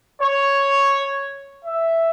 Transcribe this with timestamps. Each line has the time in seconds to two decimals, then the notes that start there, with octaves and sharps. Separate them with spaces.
0.21 C#5
1.65 E5